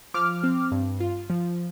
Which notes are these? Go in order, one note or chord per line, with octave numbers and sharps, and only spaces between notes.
F3 D6 F6
C4
G2
F4
F3